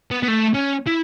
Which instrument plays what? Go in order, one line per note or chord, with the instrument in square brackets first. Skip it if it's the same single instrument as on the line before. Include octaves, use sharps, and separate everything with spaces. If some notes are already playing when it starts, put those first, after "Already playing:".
[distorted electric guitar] B3
B3
A3
C#4
E4